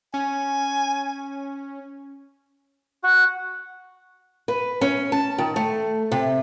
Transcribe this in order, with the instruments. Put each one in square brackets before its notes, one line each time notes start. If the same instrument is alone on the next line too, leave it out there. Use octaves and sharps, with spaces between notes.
[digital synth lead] C#4 [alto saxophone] G#5
[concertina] F#4
[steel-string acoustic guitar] B4
C#4
A5
D#3
A3
C3